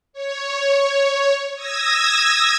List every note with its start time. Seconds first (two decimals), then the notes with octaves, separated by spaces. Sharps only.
0.13 C#5
1.55 D#6 E6 G#6 A#6